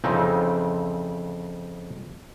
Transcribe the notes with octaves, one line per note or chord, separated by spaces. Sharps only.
F2 C#3 E3 C4 D#4